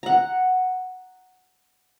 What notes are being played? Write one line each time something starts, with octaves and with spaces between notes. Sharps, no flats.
F#5 A#5